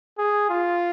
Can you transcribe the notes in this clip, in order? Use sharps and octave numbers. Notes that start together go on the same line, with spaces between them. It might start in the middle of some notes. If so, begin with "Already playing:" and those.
G#4
F4